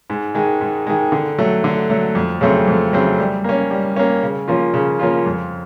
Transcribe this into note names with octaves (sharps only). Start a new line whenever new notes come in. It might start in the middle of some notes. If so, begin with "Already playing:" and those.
G#2
D#3 G#3
G#2
D#3 G#3
D3
F#3 A3
D3
F#3 A3
F2
C#3 F#3 A3 C4
F2
C#3 F#3 A3 C4
G3
A#3 C#4
G3
A#3 C#4
C#3
F3 A#3 C#4 F4
C#3
F3 A#3 C#4 F4
F2